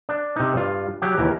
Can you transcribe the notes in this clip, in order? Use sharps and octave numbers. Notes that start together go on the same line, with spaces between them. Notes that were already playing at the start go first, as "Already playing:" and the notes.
D4
C3 D#4
G2 F4
F#3 G4 G5
D#2 E3 A#4